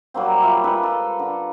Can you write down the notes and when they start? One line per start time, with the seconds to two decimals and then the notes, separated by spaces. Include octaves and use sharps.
0.14 F#3 G3 A#3 C4
0.43 G3 F4 E5
0.64 G#3 F4 A4 B4
0.83 A4
1.19 D3